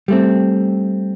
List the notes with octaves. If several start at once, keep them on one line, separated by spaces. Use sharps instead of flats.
G3 A3 C4